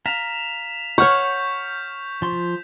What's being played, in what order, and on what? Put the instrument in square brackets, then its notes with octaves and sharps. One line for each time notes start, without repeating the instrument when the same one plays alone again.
[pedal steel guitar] F5 A#5 [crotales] B6 E7 F7
[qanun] C#5 F#5 [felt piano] C#6 F6 [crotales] G6
[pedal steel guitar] F3 C6